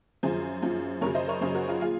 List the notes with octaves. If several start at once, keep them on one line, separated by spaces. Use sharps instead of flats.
F#2 F3 G#4 C5
F#2 F3
F#2 C#3 F#3 A#4 C#5
C5 D#5
A#4 C#5
F#2 C#3 F#3 G#4 C5
F#4 A#4
F4 G#4
A#2 F4 G#4